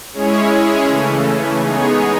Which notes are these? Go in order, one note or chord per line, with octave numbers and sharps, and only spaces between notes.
G#3 C#4 E4 G#4 C#5
C#3 E3 A3 C#4
G#3 B3 D#4 G#4 C#5